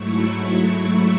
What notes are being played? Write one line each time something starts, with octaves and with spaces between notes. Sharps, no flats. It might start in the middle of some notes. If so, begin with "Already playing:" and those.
Already playing: G#2 F#3 A3 E4 C#6